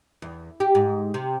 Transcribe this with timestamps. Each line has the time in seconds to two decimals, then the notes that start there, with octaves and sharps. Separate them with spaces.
0.22 E2
0.60 G4
0.75 G#2
1.14 C3